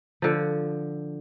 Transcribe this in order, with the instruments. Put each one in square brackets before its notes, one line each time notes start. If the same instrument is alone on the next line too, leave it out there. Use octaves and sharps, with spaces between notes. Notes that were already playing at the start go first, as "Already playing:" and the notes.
[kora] D3 F3